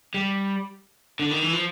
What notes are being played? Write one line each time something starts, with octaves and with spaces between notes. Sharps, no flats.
G3
D3
D#3
E3
F3